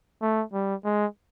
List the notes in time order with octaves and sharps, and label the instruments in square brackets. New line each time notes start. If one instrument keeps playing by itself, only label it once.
[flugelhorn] A3
G3
G#3